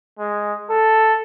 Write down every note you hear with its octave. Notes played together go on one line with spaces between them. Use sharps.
G#3
A4